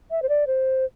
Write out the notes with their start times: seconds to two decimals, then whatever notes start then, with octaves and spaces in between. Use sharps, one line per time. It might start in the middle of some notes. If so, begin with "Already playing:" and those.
0.11 E5
0.22 C5
0.29 D5
0.47 C5